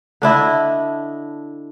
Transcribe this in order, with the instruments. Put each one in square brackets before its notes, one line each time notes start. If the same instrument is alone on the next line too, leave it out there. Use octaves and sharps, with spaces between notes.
[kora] D3 D4 E4 D#5